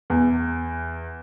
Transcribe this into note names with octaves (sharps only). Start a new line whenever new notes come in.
E2